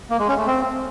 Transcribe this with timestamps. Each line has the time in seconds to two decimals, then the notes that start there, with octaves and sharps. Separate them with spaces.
0.10 A#3
0.19 G#3
0.29 C#4
0.38 A3
0.47 C4